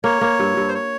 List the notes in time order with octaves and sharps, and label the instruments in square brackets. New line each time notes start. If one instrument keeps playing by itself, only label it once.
[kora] A#3 [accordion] C#5
[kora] A#3
G2
G2
[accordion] C5
C#5